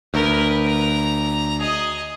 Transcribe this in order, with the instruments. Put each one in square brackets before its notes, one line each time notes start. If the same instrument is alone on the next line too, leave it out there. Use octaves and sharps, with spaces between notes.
[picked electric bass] D2 [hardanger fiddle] A#4 B4
[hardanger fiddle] A#5
G#4 D#5